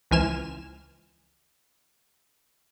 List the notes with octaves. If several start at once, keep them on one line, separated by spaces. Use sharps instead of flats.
C#2 E3 F3 G#5 F6 E7